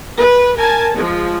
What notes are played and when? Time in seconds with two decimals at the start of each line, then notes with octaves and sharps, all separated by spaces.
0.19 B4
0.57 A#4 G#5 A5
0.95 F3 G#3